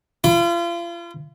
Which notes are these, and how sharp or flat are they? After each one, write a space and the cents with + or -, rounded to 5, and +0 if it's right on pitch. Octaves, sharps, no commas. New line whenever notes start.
F4 -35 B5 +0